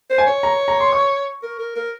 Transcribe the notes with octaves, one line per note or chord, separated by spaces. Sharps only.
C5
G#5
C#5
A#5
A#5
C6
C#6
A#4
A#4
A#4